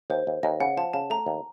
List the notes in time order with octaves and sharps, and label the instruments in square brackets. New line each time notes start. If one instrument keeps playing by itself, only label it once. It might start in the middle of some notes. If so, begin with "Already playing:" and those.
[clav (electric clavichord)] D#2 [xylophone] C5
[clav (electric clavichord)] D#2
[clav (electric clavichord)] D#2 [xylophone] D#5
[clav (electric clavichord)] C#3 [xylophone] F#5
[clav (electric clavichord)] F3 [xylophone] A5
[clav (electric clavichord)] C#3 [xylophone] A5
[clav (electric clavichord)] A3 [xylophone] A#5
[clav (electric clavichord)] D#2